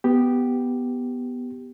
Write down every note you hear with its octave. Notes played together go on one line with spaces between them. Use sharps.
B3 G4